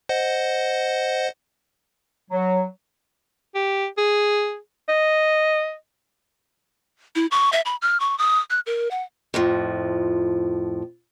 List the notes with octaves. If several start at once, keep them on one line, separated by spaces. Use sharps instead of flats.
C5 D#5 F#5
F#3
G4
G#4
D#5
E4
C#6
E5
B5
F6
C#6
D#6
F#6
A#4
F#5
F2 A2 F3